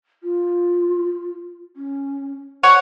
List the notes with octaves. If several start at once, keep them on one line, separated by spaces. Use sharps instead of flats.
F4
C#4
C5 C#5 F#5